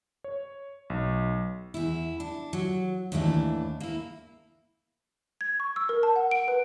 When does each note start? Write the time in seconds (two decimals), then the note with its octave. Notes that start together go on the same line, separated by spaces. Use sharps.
0.24 C#5
0.90 B1
1.74 E2 E4
2.20 D4
2.53 F#3
3.12 D#2 A2 E3 A3 D4
3.80 A#3 E4
5.41 G#6
5.60 C#6
5.76 E6
5.89 A#4
6.03 A5
6.16 F#5
6.31 D7
6.48 B4